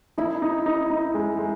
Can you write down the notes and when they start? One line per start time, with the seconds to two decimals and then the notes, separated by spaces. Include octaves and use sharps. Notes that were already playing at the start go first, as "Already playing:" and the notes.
0.18 D#4 E4
0.42 D#4
0.66 D#4
0.90 D#4
1.14 G#3
1.39 G#3